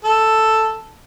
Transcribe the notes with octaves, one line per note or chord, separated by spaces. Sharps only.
A4